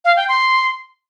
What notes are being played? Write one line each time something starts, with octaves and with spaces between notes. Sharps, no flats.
F5
G5
C6